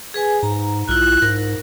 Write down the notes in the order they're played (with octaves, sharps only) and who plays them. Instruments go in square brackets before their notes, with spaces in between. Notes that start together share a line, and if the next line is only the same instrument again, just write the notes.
[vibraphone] G#4 B4 G#5
[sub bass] G#2 [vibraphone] A#5
[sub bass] B1 [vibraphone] E4 F4 [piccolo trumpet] F#6
[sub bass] G#2 [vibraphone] A#4